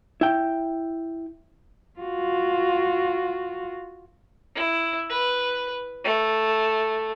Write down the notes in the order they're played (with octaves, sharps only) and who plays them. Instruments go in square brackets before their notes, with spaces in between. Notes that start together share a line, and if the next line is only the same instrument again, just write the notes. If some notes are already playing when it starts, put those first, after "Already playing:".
[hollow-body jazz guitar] E4 G5
[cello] F4 F#4
[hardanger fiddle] E4
B4
A3